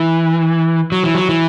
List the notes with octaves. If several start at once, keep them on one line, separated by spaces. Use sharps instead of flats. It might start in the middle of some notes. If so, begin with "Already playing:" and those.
Already playing: E3
F#3
E3
F#3
E3